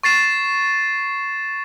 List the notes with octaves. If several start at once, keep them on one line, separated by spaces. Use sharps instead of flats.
C#6 A6 C7 E7